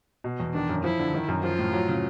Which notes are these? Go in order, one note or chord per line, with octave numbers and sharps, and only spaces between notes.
B2
E2
D#3 D4
F#2
F3 E4
D3
D#3
F#2
F3 F4
A2
F#3
C#3